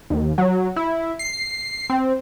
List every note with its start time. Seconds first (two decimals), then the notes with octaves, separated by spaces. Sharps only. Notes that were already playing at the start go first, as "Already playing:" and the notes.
0.10 D#2
0.38 F#3
0.76 E4
1.19 C7
1.90 C4